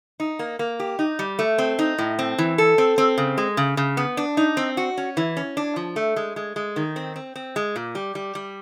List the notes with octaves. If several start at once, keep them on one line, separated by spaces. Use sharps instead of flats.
D#4
A#3
A#3
G4
D#4
G3
A3
C4
D#4
A2
C4
E3
A4
C4
C4
C#3
G#3
C#3
C#3
B3
D4
D#4
C4
F#4
C#4
E3
C#4
D4
F3
A3
G#3
G#3
G#3
D#3
C4
C4
C4
G#3
A#2
G3
G3
G3